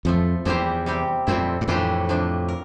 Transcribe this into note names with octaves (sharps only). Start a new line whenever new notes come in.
F2 A2 F3 A3
E2 F3 A#3 E4 G4 C5
C3 G3 C4 G4
F2 A#2 A3 C4 E4
G2
F2 A2 E3 A#3 D4 G4 C5
C3 F3 A#3 D4
A#4